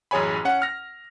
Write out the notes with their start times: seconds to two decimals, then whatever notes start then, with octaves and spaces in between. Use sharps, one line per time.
0.11 A1 F#2 G#4 C#5 G#5 B5
0.45 C#4 F#5
0.62 F6 A#6